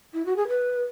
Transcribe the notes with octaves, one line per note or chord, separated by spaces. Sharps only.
E4
F#4
G#4
B4